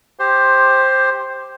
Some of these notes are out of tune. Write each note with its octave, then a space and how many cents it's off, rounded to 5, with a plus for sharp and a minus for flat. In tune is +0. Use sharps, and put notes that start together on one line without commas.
G4 +0 C5 +10 C6 +0